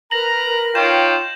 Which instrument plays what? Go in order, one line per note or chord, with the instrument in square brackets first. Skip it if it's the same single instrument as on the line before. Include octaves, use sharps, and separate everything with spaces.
[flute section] A#4 B4 [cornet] A#5 [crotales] A#6 F#7
[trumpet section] D#4 C#5 G5 [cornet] F4 [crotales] G6 E7